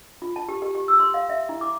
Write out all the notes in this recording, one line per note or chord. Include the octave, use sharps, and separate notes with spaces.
F4
A5
G4
G4
G4
E6
C6
F5
E5
E4
D6